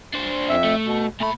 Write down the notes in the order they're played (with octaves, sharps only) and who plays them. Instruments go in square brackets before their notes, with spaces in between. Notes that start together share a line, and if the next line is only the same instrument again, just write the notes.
[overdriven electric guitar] D4 C5
[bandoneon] F2 E5
[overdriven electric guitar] A3
[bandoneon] B2
[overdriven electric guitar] A#2 B5 [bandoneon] A3